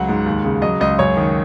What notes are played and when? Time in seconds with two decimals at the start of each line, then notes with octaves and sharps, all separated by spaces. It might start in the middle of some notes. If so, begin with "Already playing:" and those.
Already playing: C#2 F#3 F#5
0.09 G#2
0.26 D#2
0.44 C#3
0.62 F#3 D#5
0.81 C#2 D#5
0.99 F#2 C#5
1.17 D#3